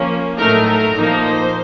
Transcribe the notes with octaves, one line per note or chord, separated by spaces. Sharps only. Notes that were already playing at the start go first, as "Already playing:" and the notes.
Already playing: F3 A#3 C#4
A2 F#3 A3 D#4 A#4
A#4
A#2 F3 A#3 D#4
C5